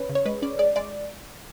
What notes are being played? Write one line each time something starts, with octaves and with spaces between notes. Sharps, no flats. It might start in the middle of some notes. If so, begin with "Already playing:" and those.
Already playing: C#4 B4
C#3
C#5
G#3 B4
C#4 D5
G#3 D5
G#3 D5